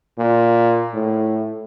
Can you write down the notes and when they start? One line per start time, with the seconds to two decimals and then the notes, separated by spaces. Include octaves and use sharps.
0.18 A#2
0.93 A2